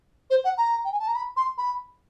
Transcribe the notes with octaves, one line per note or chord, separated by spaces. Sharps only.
C5
F#5
A#5
G5
G#5
A5
A#5
B5
C6
B5